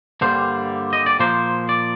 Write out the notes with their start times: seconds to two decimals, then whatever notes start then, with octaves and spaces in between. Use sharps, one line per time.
0.21 G2 D3 G3 A#3 C5
0.93 D#5
1.06 D5
1.20 A#2 F3 A#3 C5
1.69 D5